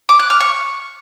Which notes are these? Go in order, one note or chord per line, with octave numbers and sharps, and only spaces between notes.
D6
F#6
F6
C#6